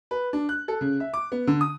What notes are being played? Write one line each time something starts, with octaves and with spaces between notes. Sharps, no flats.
B4
D4
F#6
A4
C#3
E5
D6
B3
D3
D#6